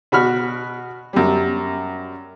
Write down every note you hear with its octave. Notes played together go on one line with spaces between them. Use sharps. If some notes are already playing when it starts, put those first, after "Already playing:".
B2 F#4 B5 F6
F#2 G3